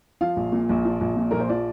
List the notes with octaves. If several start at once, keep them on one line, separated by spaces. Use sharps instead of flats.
F3 F5
A#1
A#2
A#1
F3
A#1
A#2
A#1 A#4
C5
F3 D5